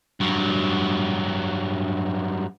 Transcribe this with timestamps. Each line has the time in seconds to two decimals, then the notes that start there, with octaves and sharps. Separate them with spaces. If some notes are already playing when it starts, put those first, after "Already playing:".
0.20 G2 F#3